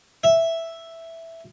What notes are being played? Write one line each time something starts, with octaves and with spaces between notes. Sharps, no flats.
E5